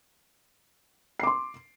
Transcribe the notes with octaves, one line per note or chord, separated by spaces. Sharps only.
C6 D6 C7